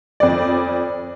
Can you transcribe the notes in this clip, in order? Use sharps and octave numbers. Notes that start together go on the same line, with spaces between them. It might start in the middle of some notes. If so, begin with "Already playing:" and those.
F2 D5